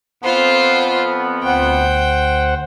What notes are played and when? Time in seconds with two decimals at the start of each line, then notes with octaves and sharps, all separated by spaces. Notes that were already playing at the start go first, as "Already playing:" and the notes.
0.23 F2 B3 F4 C5
1.44 D2 C5 F#5 G5